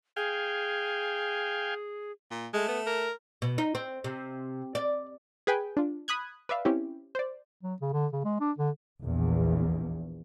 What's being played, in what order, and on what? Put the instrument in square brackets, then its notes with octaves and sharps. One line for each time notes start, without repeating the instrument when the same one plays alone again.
[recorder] G#4 [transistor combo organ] F5 G5 G#5
[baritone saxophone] A#2
[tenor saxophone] G#3 [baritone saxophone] A3
[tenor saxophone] B3
A#4
[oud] B2
D#4
C4
C3
D5
[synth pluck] G#4 B4 G5 G#5
D4 F4
B5 D#6 F#6 G#6
B4 D5 E5 F5
C4 C#4 E4 G4
C5 D5
[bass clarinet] F#3
C#3
D3
C#3
G#3
D4
D3
[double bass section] A#1 E2